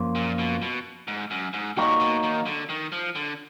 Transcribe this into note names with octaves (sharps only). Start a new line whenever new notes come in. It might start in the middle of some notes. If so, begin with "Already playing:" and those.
Already playing: F#2 F3 A#3
A#2
B2
B2
G#2
F#2
G#2
A#2 F#3 A#3 D#4 F#4
B2
D#3
D3
D#3
F3
D3